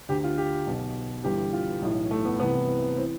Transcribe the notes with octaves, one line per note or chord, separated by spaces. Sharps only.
D2 D3 G4
F4
G4
B1 B2
G1 G2 E3 G4
F4
B1 A2 E3
A3
B3
C2 C3 E3 B3
E3 C4